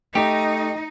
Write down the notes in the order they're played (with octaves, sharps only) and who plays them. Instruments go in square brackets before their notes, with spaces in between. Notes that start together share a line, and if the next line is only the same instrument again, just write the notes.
[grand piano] A3 [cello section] D#4 [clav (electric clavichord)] G4